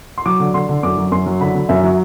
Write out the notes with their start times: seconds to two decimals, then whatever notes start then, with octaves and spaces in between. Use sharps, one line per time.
0.18 C6
0.26 F#3 D6
0.40 D3
0.54 D3 C6
0.69 D3
0.83 F#2 D6
0.97 F#3
1.12 F#2 C6
1.26 F#3
1.41 D3 B5
1.55 D3
1.69 F#2 E5
1.84 F#3